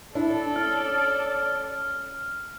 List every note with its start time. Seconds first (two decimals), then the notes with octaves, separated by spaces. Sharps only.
0.15 D4 E4 A4 D5
0.56 C#4 F6